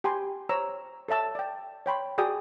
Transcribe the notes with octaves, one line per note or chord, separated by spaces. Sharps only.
G4 G5 G#5 B5 C6
C5 C#5 A#5 E6
A4 C#5 E5 A5 E6
D5 G5
C#5 G5 B5 C6
F#4 G#4 D5 G5 D#6